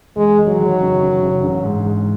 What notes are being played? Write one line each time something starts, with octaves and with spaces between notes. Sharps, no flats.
E1 G#3
E1
F#3
D#3
F#1
F#1
F#1
A1
G#2
G#2